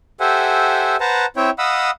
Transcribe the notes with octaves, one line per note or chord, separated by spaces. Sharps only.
G4 A4 C5 E5 F#5 G#5
B4 C5 F#5 A5 A#5
C4 E4 C#5 E5 G5
D#5 F5 F#5 B5 D#6 E6